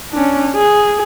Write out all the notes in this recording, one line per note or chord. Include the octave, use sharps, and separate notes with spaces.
C#4 D4
G#4